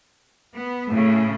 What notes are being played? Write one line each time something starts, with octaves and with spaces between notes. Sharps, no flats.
B3
A2 C#3